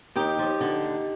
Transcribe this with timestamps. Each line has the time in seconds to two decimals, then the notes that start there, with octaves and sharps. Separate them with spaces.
0.15 D#2 D#4 G4
0.39 F3
0.61 D3
0.82 D#2